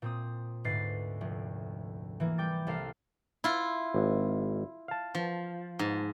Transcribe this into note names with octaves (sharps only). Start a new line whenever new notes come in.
A#2 C4 D#6
D2 G#2 B4 A6 C7
F1
E3 A#3
G3 G5 D6 A6
C2 A#3 A4 A#4 F5 C7
E4 F4
G#1
F5 A5
F3
G#2